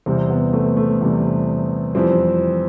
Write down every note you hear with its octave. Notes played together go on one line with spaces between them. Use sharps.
E2 C3 G3 C4
B3
A3
A3
E2 C3 G3
F2 E3 G3 C4